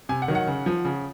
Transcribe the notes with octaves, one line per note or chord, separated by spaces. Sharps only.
C3 G#5
F#5
D#3 F#3
F#5
C#3
F3
C#3